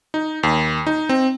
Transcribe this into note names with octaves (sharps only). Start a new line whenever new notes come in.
D#4
D#2
D#4
C4